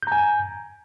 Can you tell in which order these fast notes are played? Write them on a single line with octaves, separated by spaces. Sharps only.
G6 A#5 G#5